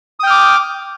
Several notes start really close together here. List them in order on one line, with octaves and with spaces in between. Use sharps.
D#6 G5 F6 D6